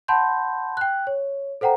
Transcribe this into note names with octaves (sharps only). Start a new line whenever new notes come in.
F#5 A5 B5 C6 G6
G5 F#6
C#5
A4 C5 F#5 G5 A#5